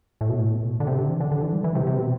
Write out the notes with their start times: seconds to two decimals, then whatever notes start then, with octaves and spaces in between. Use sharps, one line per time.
0.21 A2
0.29 B2
0.39 A2
0.65 B2
0.80 D3
0.87 C3
0.98 D3
1.09 E3
1.20 D3
1.31 D3
1.43 E3
1.53 G3
1.64 E3
1.75 C3
1.87 C3
1.97 B2